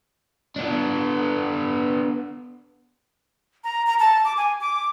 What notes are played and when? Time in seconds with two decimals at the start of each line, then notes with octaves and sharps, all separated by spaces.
0.56 B3 D4
3.64 A#5
3.87 A#5
3.99 A5
4.25 D6
4.37 G#5
4.61 D6